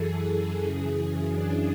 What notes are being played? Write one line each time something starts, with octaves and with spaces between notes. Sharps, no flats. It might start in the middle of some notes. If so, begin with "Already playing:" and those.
Already playing: F#2 E3 G#4 A4
F#2 C#3 E3
D4